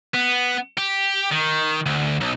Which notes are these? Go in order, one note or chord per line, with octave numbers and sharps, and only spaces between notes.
B3
G4
D#3
D2
B1